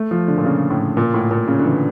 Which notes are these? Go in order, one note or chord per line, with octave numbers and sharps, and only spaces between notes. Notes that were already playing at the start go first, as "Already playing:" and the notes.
Already playing: A3
F3
D3
A#2
C#3
A2
A#2
A2
A#2
C#3
D3
E3